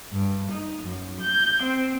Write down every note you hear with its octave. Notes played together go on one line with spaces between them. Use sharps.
G2
D#4
F#2
G6
C4